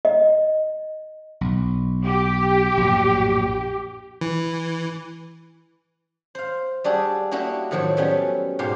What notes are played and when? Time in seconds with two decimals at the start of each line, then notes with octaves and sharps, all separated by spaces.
0.05 D#5
1.41 B1
2.05 G4
2.77 A#1 F#2 A2
4.21 E3
6.35 C5 F5
6.84 G3 D4 F#4 G#4 A4
7.31 A#3 D4 E4 F#4 G4 D#5
7.71 A2 D#3 F3 F#3 A3
7.97 F#3 G3 A3 B3 C#4
8.59 G#2 B2 G4 F5 C6